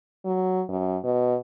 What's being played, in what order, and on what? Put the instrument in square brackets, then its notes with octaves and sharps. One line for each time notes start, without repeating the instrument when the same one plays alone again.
[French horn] F#3
F#2
B2